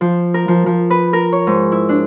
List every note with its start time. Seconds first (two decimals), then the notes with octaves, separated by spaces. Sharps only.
0.01 F3
0.34 A#4
0.48 F3
0.66 F3
0.90 B4
1.13 A#4
1.33 C#5
1.47 G#2
1.72 E4
1.89 D4